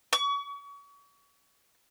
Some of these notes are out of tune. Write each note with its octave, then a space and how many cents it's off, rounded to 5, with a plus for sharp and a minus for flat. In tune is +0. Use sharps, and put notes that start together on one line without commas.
C#6 +35